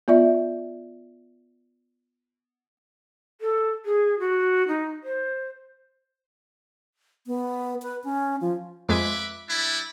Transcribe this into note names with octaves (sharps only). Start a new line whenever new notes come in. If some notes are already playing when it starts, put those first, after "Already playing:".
B3 F4 D5 E5
A4
G#4
F#4
D#4
C5
B3
B4
C#4
F3
F2 G#3 B4 E5 D6 G#6
G3 D4 E4